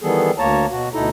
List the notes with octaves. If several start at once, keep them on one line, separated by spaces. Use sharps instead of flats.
D#3 E3 G3 B3 G#4 A4
D2 A#3 C#5 A5 A#5
B2 F#4
D2 B2 D#4 E4 A4 A#5